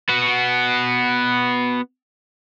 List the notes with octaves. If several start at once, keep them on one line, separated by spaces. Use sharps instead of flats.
B3 F#4